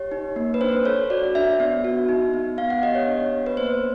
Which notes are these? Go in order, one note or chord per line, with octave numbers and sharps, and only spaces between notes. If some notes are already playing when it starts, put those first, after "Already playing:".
Already playing: G4 C#5
D#4
A#3
B4
D4 C5
A4 C#5
F#4 D5
D4 E5
B3
F#4
D#4
B3
B3 F5
F#5
G4 D#5
C#5
D4
B3
B4
A#3 C5